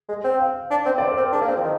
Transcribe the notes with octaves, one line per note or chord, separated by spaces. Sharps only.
G#3
C4
F5
D4
C4
D5
C5
A#4
C4
D4 G#4
A#3
C4
F3
D#3